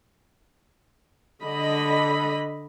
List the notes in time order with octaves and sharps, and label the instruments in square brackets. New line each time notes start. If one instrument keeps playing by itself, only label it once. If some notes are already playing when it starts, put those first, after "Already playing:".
[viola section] D3 D#5 B5